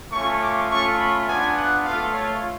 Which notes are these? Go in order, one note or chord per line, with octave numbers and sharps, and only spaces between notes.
A3 C#4 F4 C#6
D6
A3 C#4 F4 C#6
B5
B3 D4 F4 G#5
F#5
A3 F4 F5
C#5